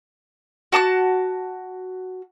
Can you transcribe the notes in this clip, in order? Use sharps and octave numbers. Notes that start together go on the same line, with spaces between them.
F#4 A5 D6 F#6